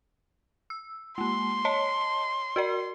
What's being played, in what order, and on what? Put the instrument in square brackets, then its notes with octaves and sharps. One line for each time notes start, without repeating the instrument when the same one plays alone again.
[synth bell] E6
[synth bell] G#3 A#3 [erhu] C6
[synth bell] C#5 D#5 A5
F#4 A#4 D5